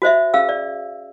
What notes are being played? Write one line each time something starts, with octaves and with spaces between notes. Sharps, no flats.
F#4 C5 D#5 E5
C#4 G#4 F5 E6
D5